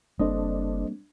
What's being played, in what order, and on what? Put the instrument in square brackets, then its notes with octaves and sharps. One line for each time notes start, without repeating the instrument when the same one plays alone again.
[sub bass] F#1 [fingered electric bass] G3 A#3 C4 [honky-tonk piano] D4 [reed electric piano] A4 C5 D#5